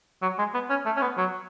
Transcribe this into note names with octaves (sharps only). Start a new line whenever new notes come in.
F#3
G#3
B3
C#4
A3
C#4
B3
F#3